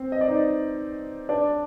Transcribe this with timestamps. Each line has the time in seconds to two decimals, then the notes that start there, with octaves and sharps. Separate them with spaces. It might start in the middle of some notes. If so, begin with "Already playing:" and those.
Already playing: C4 C5
0.12 D#5
0.21 D5
0.28 D#4 D#5
1.29 D4 D5